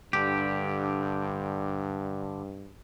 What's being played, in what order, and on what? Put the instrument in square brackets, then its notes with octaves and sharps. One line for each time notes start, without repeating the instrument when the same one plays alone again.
[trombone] G2 [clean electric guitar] D3 G4